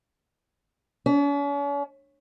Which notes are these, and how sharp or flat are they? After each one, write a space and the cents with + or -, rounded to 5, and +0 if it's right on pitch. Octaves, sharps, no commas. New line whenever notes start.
C#4 +45